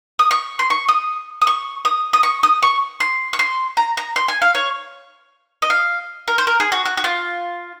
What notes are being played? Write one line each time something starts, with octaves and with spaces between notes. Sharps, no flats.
D#6
C#6
C6
C#6
D#6
D#6
C#6
D#6
D#6
C#6
D#6
C#6
C6
C#6
C6
A#5
A#5
C6
G#5
F5
C#5
D#5
F5
A#4
C5
A#4
G#4
F#4
F#4
F#4
F4